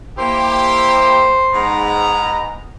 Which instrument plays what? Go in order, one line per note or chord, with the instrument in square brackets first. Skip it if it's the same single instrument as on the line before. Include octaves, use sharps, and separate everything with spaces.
[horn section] A#3 E4 G4 [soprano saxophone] C5
[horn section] G#2 B3 A#5